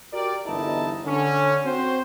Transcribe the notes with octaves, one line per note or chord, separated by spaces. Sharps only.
F#4 G4 A#4 D5
G1 E2 D#4 E4 D#5 A5
D3 C#4
C4 F#4 C5